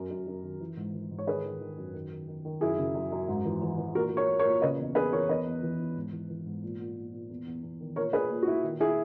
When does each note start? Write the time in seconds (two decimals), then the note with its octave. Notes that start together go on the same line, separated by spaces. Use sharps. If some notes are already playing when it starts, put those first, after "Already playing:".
Already playing: F#2 A#4
0.10 F#2
0.27 F#2
0.43 D#3
0.61 E3
0.77 G#2
0.94 E3
1.11 G#2
1.19 C#5
1.27 D#3 G#4 B4
1.45 D#3
1.60 D#3
1.78 F#2
1.94 D#3
2.11 D#3
2.28 D#3
2.45 D#3
2.61 F#2 E4 G#4
2.78 C#3
2.95 F#2
3.12 F#2
3.28 G#2
3.45 E3
3.62 E3
3.78 E3
3.95 A#2 F#4 A#4
4.12 A#2
4.17 A#4 C#5
4.29 A#2
4.39 A#4 C#5
4.45 A#2
4.61 C#3 B4 D#5
4.79 E2
4.95 E2 G#4 B4
5.12 E3 A#4 C#5
5.29 E2 B4 D#5
5.46 E2
5.62 E3
5.79 E2
5.96 G#2
6.12 E3
6.30 E3
6.46 G#2
6.63 A#2
6.79 A#2
6.97 A#2
7.13 A#2
7.29 E2
7.46 E2
7.63 E2
7.80 D#3
7.96 A#2 A#4 C#5
8.13 A#2 G#4 B4
8.30 A#2
8.43 F#4
8.47 A#2 E4
8.64 D#3
8.80 E4 G#4